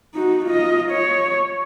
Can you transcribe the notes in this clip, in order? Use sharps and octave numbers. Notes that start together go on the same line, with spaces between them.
D#4 F#4
F4 D#5
C#5